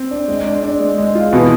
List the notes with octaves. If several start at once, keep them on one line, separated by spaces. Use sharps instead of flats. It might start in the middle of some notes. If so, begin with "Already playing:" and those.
Already playing: C4
D4
G#3
D4
D4
G#3
G#3
F4
B2 E3 B3